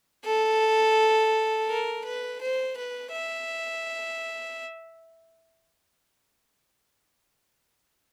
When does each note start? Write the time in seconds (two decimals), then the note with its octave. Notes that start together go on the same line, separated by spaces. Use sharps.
0.25 A4
1.69 A#4
2.05 B4
2.41 C5
2.77 B4
3.12 E5